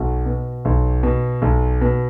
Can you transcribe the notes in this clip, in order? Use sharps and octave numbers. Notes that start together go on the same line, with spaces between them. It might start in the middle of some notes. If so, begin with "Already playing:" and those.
Already playing: B1 F#4
B2
B1
B2
B1
B2